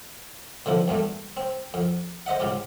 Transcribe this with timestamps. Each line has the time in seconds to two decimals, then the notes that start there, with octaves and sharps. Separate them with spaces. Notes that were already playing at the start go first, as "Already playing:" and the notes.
0.66 B2 D3 F3 E4
0.88 B1 E2 G2 A3
1.37 C4
1.74 F2
2.26 C5 D#5 E5 F#5
2.40 G#2 C#3 F4 G4